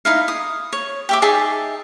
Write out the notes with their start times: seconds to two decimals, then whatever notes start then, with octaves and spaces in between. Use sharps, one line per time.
0.05 D#4 E4 F5
0.28 D#6
0.73 C#5
1.09 G4 E5 D6
1.22 D#4 G#4 E5 A5